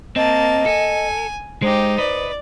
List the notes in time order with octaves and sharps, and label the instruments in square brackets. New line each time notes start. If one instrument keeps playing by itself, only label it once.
[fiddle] A#3 A5 [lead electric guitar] C4 [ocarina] D#5
[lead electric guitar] A4 [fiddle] G#5
[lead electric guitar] G#3 [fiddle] D#4 G4 [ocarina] C5
[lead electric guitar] B4 D#5 [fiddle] D5